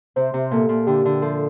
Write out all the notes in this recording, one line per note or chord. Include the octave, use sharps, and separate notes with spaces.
C3 C5
C3
A#2 A4
A#2
D3 G4
D3
F3 A4